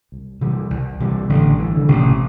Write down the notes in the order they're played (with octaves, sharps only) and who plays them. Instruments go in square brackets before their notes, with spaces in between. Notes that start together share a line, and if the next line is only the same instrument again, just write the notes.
[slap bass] C2
C3 E3 G3
C2
C3 E3 G3
[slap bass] A1 [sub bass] D3
[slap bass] G2 E3
[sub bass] D3
[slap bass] A1 [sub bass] C3